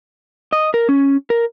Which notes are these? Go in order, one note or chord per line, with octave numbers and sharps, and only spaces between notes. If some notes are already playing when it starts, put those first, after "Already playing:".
D#5
A#4
C#4
A#4